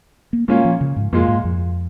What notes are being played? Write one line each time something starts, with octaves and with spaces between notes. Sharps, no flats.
A#3
A#2 G#3 A#3 C#4 F4
F3
C#3
G#2
F2 A#2 G#3 F4
G#2
F2